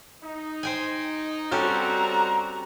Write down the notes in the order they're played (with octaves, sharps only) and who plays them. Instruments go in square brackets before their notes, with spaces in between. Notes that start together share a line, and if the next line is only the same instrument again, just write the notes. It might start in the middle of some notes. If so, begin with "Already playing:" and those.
[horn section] D#4
[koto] C5 G5 G#5
[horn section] G3 C4 [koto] C#4 G4 A4 [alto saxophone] F#4 [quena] A#5